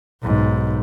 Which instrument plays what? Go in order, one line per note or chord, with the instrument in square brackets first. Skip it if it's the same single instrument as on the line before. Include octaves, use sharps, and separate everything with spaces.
[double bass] B1 G#2